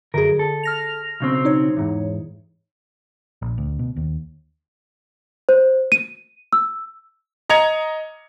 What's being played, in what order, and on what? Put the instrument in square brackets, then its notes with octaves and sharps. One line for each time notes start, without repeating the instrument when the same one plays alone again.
[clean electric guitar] F#2 A#4 [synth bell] D3 G#4
[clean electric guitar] A4
[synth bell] F6 A#6 F7
[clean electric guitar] B1 C#3 C4
[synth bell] D#4 C#5
[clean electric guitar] E2 G#2
[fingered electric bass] A#1
D2
B2
D#2
[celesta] C5
D#7
E6
[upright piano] D#5 A#5 G#6 C#7 F7